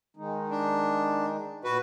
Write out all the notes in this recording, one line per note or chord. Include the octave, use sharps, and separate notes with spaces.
D#3 G#3 D#4
D4
A#2 F#4 B4